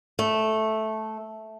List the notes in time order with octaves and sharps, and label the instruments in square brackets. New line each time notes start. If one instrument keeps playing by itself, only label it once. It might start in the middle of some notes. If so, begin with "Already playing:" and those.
[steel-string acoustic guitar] A3